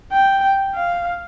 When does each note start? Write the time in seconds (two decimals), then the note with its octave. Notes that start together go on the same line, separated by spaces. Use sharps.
0.12 G5
0.75 F5